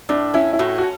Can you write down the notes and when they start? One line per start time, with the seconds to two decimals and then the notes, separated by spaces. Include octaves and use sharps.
0.09 A2 D4
0.34 C#4 E4
0.53 E4
0.59 A2 F#4
0.78 F#4